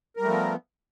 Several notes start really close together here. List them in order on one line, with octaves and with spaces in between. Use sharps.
A#4 G3 A3 F3 B3